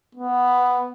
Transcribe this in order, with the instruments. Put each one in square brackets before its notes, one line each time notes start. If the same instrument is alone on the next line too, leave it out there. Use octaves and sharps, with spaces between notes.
[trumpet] B3